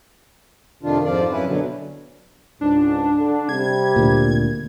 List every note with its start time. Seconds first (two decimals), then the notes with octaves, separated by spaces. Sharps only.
0.83 F2 C3 D#3 D4 F4
1.05 F2 G#2 F3 F4 D5
1.32 F#2 C#4 E4 B4
1.46 B2 D3 F#3
2.61 C#2 G#2 D4
3.17 D3
3.49 C3 G3 G#6
3.96 D2 A#2